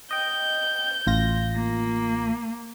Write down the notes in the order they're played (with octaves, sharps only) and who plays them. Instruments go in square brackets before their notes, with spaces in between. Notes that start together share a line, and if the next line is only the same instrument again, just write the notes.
[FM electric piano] D#5 G5 [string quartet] G6
[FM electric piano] A1 F4 A#6
[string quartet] A#3